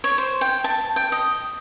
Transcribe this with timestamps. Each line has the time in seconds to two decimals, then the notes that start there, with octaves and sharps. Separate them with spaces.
0.04 C#5
0.18 C5
0.41 G5
0.64 A5
0.96 G5
1.12 D#5